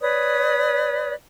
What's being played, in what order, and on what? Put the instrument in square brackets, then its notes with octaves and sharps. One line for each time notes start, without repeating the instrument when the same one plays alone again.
[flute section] B4 C#5 D5 D#6